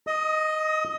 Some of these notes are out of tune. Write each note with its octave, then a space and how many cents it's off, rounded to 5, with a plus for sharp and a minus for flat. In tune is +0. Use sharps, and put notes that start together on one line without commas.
D#5 +0 D#6 +35